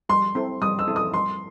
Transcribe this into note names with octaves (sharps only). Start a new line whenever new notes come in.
G3 C6
C4 E4 A4
G3 D#6
E6
C4 E4 A4
D#6
G3 C6